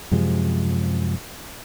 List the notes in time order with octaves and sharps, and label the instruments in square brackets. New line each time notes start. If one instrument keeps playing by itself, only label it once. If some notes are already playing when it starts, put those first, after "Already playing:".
[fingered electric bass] F#2 C3 F3 G#3